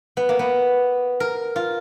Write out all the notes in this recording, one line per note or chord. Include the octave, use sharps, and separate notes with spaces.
B3
A#3
B3
A#4
F4